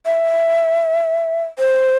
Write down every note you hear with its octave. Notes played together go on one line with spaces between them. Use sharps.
E5
C5